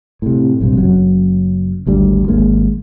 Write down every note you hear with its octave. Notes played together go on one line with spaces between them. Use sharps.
A2 C3
A#1 G2 C3
F#1 F#3 C#4
G#1 D2 G3
G#1 G#3 A#3